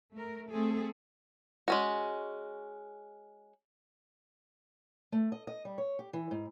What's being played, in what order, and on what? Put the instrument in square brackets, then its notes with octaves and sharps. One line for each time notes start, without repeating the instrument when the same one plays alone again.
[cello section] A3 A#4
A3 C4 G#4 A4
[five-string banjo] G#3 C#4 F#4
[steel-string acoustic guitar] A3
D#5
D#5
G3
C#5
G4
E3
G#2